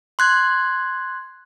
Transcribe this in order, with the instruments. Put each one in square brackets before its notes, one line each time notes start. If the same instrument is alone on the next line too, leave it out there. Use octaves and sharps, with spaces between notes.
[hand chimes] C6 F#6 G#6